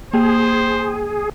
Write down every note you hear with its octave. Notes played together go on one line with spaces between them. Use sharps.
A#3 G#4 C5 G5